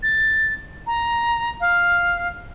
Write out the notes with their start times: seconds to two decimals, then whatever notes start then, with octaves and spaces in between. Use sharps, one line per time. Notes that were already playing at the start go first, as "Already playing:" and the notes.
0.03 A6
0.87 A#5
1.61 F5